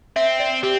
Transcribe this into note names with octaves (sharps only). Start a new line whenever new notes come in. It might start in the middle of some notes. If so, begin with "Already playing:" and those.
C4 E5
D5
C4 G4